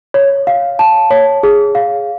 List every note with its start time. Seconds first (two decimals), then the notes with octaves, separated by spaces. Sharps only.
0.14 C#5
0.47 F5
0.79 A5
1.11 C#5
1.43 G#4
1.75 F5